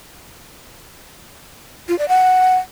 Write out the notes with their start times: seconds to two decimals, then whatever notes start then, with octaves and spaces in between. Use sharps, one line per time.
1.89 F4
1.99 D5
2.09 F#5